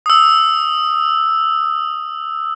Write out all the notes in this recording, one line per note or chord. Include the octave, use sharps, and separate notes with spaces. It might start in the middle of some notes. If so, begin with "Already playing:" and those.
D#6 E6